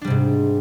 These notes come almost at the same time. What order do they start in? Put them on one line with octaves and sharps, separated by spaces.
D4 G3 C3 G#2